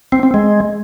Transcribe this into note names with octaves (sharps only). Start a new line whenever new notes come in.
C4
C4
G#3